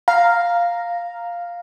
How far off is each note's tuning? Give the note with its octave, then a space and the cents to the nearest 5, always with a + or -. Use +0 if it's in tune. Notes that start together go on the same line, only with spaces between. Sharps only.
F5 +0 A#5 +0